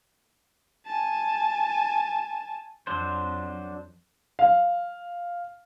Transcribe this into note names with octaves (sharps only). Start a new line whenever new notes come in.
G#5 A5
F2 F#3 D4 C5
F5